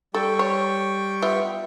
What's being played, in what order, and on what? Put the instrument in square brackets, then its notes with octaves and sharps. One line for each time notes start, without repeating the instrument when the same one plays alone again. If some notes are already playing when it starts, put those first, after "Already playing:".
[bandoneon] G3 G5 C#6 [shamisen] A4
[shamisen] C#5
B3 F4 E5